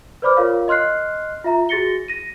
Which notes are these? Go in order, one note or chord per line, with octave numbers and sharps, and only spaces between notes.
B4 C5 D5 B5 D6 F6
F4 A#4 C#5 F5
D#5 C6 F6 F#6 C7
F4 E5 A#5
F#4 G#4 A6 A#6 C#7 G7
A#6 D#7